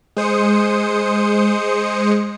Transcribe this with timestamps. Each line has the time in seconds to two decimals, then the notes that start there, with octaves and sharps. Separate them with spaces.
0.17 G#3 C5 D#6 C#7